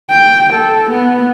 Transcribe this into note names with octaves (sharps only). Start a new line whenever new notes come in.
G5
A4
B3